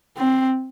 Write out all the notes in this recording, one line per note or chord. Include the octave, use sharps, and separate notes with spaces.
C4